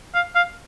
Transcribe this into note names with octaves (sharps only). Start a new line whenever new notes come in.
F5
F5